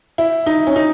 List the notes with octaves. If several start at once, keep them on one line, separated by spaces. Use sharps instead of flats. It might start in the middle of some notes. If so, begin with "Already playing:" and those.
E4
D#4
C#4
D#4